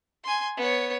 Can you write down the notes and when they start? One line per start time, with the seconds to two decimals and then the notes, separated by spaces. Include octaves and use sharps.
0.24 G#5 C6
0.57 B3 C#5